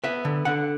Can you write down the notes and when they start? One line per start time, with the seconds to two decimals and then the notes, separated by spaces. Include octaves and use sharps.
0.04 B3 E5
0.25 D3
0.45 D3 F#5